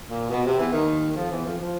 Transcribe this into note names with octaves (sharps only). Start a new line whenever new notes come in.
A#2
B2
C3
E2 E3
D#2 D#3
F2 F3
E2 E3
F2 F3
F3